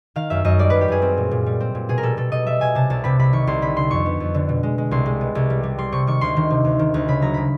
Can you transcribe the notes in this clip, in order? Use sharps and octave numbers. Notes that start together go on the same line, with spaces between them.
D#3 F5
F#2 E5
F#2 D#5
G3 D5
F#2 B4
G4
F#2 G#4
C4
A#2
A#2
G3
C4
A#2
B2 G#4
A#4
G3 A4
B2 A4
B2 D#5
G3 E5
B2 G#5
C3 A5
C2 A5
C3 B5
C2 B5
D#3 C#6
C2 C6
D3 B5
D3 C6
F2 C#6
B3
F2
D3
B2
G#3
G#3
C2 C6
G#3
B3
C2
G3
G3
G3 C6
C3 C#6
D#3 C#6
D2 C6
D#3
C3
D2
D#3
D2
C#3 B5
F#3 A#5
C#3 B5